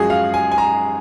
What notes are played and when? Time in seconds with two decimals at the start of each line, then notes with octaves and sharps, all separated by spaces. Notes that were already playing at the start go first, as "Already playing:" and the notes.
Already playing: F#2 F3 G#3 F#4 G#4
0.10 F5
0.34 G#5
0.52 G#5
0.58 A#5